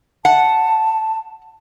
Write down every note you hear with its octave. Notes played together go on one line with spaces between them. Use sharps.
F#5 A5